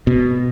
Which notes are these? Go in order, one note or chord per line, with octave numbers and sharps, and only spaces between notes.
B2